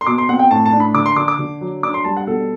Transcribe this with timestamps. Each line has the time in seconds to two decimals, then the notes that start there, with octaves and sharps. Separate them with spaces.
0.01 C6
0.07 B2 D6
0.18 C6
0.29 C4 F#5
0.39 G5
0.51 A2 A5
0.66 A5
0.72 D4
0.80 B5
0.94 D3 D6
1.06 C6
1.16 D3 D6
1.28 D6
1.39 D3
1.61 F#3
1.83 D4 D6
1.94 C6
2.04 G3 A5
2.17 F#5
2.27 B2 A4